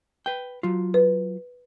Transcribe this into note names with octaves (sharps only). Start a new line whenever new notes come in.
B4 G5
F#3 F4
B4